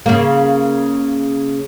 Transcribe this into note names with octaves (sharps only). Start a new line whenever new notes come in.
C#3 A#3